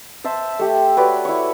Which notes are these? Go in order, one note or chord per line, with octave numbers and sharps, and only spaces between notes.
C5 E5 A5
A3 G4
F#4 B4 C#5 D5
E4 C#5